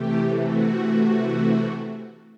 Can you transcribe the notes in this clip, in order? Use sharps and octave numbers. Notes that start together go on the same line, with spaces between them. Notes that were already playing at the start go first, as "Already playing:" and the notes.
Already playing: C3 E3 A3 G4
F#4